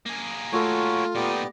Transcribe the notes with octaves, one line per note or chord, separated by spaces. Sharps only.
A#3 G#4
A3 F4 F#4 A4 C#5
A#2 B3 D#4 G4 D5